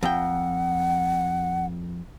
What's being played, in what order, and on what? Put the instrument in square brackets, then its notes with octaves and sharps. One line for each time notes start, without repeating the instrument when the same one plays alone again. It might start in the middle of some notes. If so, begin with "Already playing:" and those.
[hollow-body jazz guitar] F2 G5 [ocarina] F#5